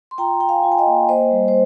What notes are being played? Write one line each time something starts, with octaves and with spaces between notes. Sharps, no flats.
C6
F4 G5 A#5
F4 G5
F5 G#5
F4
G#5
D#5 G5
A#3
A#3 C5 D#5
G3
C5